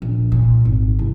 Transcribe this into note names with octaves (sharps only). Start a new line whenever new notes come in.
A#1
A#2
G#1
C2